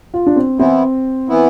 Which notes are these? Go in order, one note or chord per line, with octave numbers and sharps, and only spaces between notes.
F4
D4
C4
E3 B3 C4 E4
E3 B3 E4